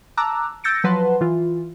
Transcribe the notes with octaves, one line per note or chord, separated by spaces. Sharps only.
A5 A#5 D6 E6 F#6
E6 G6 A6 A#6 C#7 D7
F3 F#3 B4 F#5 A5 C6
E3 F4